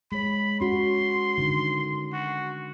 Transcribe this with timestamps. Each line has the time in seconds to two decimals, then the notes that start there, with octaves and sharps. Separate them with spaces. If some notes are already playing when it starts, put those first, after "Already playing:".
0.12 G#3 C#5 B5
0.61 C#4 F#4 C6
1.38 D3 D#3
2.13 F#4